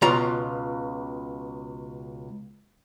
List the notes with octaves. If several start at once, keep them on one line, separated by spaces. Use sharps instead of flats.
C#2 B2 F4 A#5